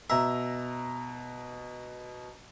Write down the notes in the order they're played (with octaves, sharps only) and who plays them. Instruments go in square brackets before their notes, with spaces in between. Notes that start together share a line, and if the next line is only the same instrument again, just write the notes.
[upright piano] B2 A#5 [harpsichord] E5